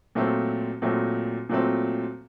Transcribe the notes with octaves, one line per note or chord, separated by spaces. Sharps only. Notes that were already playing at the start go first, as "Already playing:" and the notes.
A#2 F#3 A3 C4
A#2 F#3 A3 C4
A#2 F#3 A3 C4